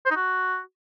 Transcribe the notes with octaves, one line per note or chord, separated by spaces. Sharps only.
C5
D#4
F#4